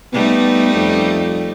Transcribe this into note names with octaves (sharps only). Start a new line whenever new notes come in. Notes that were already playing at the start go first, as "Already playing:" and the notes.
G3 A3 B3 D#4
F2